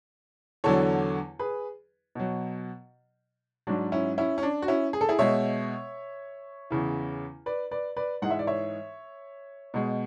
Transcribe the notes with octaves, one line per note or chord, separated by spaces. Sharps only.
E2 D3 F#3 A4 C#5
G#4 B4
B2 F#3
G#2 F#3 D4 F#4
C#4 E4
C#4 E4
C#4
D4
F#4
C#4 E4
G#4
A4
E4 G#4
B2 G#3 C#5 E5
E2 C#3 E3
B4 D5
B4 D5
B4 D5
G#2 E3 G#3 F#5
E5
D5
C#5 E5
B2 G#3